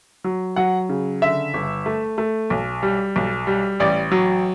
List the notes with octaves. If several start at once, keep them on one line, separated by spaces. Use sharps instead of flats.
F#3
F#3 F#5
C#3
D3 E5
G1
A3
A3
B1
G3
B1
G3
A1 D5
F#3